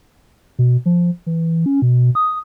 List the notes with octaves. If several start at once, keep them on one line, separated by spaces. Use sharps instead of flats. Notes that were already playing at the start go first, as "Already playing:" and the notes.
B2
F3
E3
C#4
B2
D#6